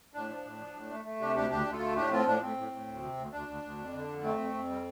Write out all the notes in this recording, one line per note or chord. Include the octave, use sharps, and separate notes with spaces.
A2 D4
F3
A2
F3
A2
A3
A3
C3 D4 G4
D2 D4 G4
D2 D4 G4
D2
F4 A4
A3
A2 D4 G4
F3 C4 F4
A2 D4
A2 C4
A2
A2
D2
C3
D2
D2 D4
D2
D2
F2
D3
F2
A3 C4
F2
F2
G3